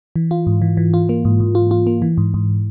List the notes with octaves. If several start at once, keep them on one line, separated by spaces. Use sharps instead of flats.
E3
F4
G#2
E3
E3
F4
A#3
G#2
G#2
F4
F4
A#3
E3
G#2
G#2